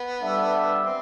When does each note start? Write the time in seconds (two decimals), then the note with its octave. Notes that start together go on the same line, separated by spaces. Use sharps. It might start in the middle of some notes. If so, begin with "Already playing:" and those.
Already playing: B3
0.20 G3 D4 A4 E5
0.85 C4